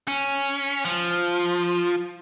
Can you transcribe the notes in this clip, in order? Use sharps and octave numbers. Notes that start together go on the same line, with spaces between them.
C#4
F3